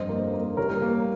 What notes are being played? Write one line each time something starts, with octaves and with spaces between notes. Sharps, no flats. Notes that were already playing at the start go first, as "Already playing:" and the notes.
Already playing: F1 G2 C5 D#5
A#3
A#3
G3 A#4 C#5
A#3